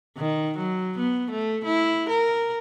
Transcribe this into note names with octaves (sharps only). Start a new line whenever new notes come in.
D#3
F#3
B3
A3
E4
A#4